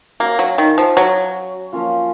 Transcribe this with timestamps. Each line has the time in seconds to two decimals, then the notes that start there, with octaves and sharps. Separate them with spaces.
0.20 A#3 C#4 F#4 C#5 F5
0.39 F#3
0.58 D#3
0.78 F3
0.97 F#3
1.73 F3 A#3 C#4 F4